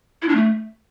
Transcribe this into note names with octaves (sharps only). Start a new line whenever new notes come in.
E4
D4
A3